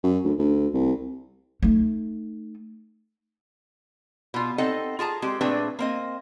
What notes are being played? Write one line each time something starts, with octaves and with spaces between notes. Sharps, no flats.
F#2
D2
D2
C2
A3 D#4
B2 F4
C4 D#4 A4 D#5 F#5
F4 G#4 A5 A#5
G#3 C4 G4
A#2 A3 C4 D4 G#4 B4
A#3 C4 D#5